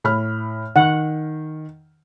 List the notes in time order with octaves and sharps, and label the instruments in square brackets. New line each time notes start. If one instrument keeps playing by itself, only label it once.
[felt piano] A2 B5 F6
[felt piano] D#3 [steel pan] F#5